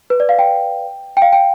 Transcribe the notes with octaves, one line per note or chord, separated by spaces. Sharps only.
B4
D5
F5
G5
G5
F5
G5